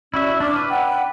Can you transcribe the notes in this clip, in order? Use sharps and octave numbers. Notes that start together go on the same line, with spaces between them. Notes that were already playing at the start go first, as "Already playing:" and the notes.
C#4 E4 F#4 D5 E5
D4 D6 F6
B4
F#5 G5